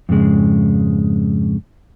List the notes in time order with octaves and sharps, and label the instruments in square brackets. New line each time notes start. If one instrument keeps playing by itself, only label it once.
[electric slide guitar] F2 G#2 C#3 G#3